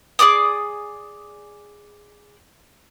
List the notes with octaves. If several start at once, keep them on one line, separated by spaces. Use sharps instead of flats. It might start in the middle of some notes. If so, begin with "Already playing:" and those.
G#4 D5 D6 D#6